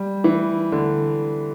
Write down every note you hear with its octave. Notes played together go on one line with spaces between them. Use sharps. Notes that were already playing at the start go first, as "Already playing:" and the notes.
Already playing: G3
E3
D3